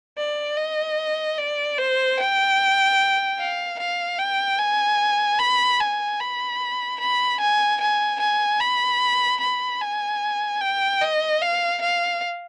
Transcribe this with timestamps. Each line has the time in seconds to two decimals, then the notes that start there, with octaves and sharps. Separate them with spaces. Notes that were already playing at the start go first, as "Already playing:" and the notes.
0.18 D5
0.57 D#5
1.38 D5
1.78 C5
2.18 G5
3.39 F5
3.79 F5
4.19 G5
4.59 G#5
5.39 B5
5.80 G#5
6.20 B5
7.00 B5
7.41 G#5
7.81 G#5
8.20 G#5
8.60 B5
9.41 B5
9.81 G#5
10.61 G5
11.02 D#5
11.42 F5
11.82 F5